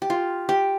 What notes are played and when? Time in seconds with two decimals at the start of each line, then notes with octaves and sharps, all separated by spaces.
0.02 G4
0.10 F4
0.49 G4